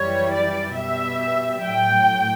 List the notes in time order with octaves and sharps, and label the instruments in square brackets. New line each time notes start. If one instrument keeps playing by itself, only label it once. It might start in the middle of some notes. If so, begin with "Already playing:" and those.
Already playing: [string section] F#2 E3 G3 C#5
D5
B2 G3 E5
A2 F#3 G5